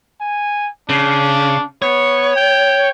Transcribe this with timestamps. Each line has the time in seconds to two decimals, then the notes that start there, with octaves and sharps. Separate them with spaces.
0.21 G#5
0.89 C#3 D4
1.82 B3 C#5
2.36 G5